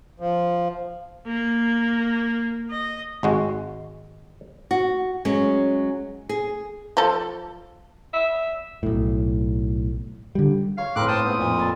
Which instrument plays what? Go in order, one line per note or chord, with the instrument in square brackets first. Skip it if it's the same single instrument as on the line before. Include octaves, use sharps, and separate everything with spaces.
[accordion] F3
[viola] A#3
D#5
[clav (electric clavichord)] G#1 G#3 F#4
[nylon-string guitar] F#4
F#3 G#3 C#4
G#4
[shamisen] F3 A4
[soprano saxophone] E5
[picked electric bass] B1 A2
D3 G3
[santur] C#5 [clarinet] F5
[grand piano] A2 [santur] C4 A#4 B4 [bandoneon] D6 F#6
[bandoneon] C5 G5 A5 [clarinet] D#6
[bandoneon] G#2 B3
F2 A#2
[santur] A5